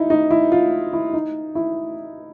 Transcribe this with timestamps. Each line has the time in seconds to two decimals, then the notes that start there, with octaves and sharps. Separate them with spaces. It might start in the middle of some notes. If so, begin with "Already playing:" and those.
Already playing: D#4 E4
0.10 D#4
0.31 E4
0.52 F4
0.93 E4
1.13 D#4
1.55 E4